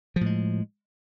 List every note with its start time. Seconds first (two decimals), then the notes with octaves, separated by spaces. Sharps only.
0.16 F3
0.21 A2
0.26 G#3